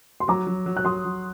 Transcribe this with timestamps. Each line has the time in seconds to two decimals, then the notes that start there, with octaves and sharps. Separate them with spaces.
0.20 C6
0.28 F#3 A#5 D6
0.47 F#3
0.66 F#3
0.77 F#6
0.85 F#3 C6 D#6
1.05 F#3